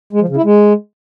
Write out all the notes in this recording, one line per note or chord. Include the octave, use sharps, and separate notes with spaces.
G#3
F3
C#3
E4
G#3